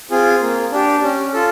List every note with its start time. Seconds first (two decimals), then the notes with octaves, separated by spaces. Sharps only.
0.11 C4 F4 G#4
0.41 A#3
0.72 D4 G4
1.03 C#4
1.34 F4 A4